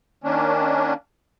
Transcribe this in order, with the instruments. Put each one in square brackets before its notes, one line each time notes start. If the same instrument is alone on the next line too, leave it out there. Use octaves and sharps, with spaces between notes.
[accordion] D#3 A#3 C#4 D4